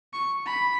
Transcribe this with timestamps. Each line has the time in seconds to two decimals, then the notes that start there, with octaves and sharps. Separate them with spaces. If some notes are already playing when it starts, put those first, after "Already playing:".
0.13 C#6
0.47 B5